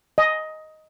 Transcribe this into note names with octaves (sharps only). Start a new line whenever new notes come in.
D#5